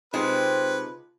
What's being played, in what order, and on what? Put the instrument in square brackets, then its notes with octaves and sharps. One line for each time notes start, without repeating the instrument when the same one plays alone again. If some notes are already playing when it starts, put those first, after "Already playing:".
[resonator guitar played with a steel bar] C3 G#3 [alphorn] C4 [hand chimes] D#4 F4 [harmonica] B4